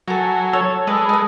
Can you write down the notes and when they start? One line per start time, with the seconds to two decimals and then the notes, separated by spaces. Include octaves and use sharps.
0.08 F#3 A4 G#5 A#5
0.53 A4 C#5
0.87 G#3 B4 D5 D#5
1.09 B3 D#4